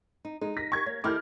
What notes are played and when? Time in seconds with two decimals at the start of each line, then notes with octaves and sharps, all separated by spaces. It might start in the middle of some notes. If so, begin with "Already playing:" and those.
0.25 D#4
0.41 G#3 D#4
0.57 A#6 B6
0.72 C#6 G#6
0.86 A#3 C#5
1.04 D#3 A3 E4 D6 F6 G6